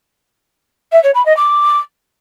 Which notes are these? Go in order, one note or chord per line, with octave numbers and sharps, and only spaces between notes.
E5
C#5
B5
D#5
D6